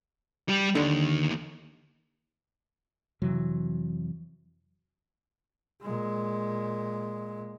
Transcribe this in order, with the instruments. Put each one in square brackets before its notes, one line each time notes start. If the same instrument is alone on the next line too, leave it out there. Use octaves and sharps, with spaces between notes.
[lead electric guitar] G3 G4
[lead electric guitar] D#2 D#3 [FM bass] D3
[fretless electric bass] F2 C3 E3 F#3
[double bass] A#2 G#3